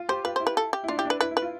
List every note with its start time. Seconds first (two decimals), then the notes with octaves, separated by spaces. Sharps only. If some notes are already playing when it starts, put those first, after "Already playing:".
Already playing: F4
0.09 G4 C5
0.24 F4 B4
0.36 E4 C5
0.47 B4
0.57 A4
0.73 G4
0.84 E4
0.88 D4 F4
0.97 E4 G4
1.05 D4
1.10 B4
1.21 E4 B4
1.31 E4
1.37 B4
1.42 F4